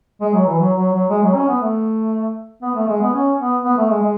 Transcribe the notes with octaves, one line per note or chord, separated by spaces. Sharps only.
G#3
F#3
E3
F#3
F#3
F#3
G#3
F#3
C#4
B3
A3
B3
A3
G#3
B3
C#4
B3
B3
A3
G#3
G#3